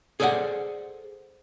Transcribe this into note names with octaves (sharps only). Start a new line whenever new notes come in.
G#4 A4 C5 D5 E5 F#5